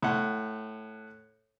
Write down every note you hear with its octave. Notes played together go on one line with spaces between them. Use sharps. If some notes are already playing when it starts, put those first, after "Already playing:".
A2 F#5